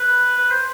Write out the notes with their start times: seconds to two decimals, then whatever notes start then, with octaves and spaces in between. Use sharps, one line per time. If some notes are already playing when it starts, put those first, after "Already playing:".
Already playing: B4
0.37 B4
0.51 C5